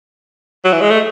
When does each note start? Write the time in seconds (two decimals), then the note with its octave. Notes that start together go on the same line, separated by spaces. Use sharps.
0.65 F#3
0.73 E3
0.81 G#3
0.90 A3